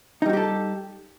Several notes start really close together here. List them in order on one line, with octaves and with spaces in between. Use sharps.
D#4 G3 F#4 G4 A4